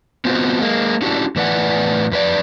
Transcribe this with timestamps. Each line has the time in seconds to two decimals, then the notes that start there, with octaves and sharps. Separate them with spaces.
0.25 B3 C4 F4 F#4 C5
0.61 G#3 A#3
1.02 C#4 D4 E4 F#4 G4 A4
1.36 A2 E3 B4 D5 F#5
2.11 F2 B4 D5